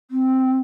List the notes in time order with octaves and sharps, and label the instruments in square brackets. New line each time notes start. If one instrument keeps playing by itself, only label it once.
[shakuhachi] C4